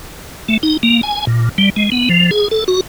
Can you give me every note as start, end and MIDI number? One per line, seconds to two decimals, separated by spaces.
0.48 0.58 57
0.63 0.77 63
0.83 1.01 58
1.03 1.25 80
1.27 1.49 46
1.58 1.70 55
1.76 1.90 56
1.92 2.09 59
2.09 2.31 53
2.31 2.48 68
2.51 2.64 69
2.68 2.81 66